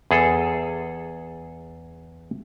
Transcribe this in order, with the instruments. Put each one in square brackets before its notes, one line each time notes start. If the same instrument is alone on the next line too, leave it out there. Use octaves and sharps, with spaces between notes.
[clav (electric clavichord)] E2 G#4 A4